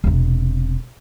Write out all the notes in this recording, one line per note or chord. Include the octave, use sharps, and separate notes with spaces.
E1 C3